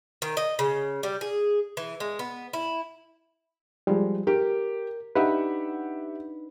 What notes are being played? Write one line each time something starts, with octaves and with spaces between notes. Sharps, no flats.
D#3
D#5
C#3
G3
G#4
E3
G#3
B3
E4
F3 G3 G#3
G4 A#4
D4 D#4 G4 B4 E5 F#5